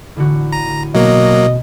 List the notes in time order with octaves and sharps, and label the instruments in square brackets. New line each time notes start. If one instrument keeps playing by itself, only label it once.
[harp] A1 D3 F#4
[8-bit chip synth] A#5 [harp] D#7
[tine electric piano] B2 [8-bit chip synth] F#3 A#3 [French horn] D#5